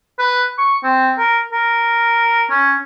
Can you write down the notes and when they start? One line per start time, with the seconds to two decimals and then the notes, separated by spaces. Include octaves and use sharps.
0.19 B4
0.58 C#6
0.84 C4
1.18 A#4
1.53 A#4
2.50 C#4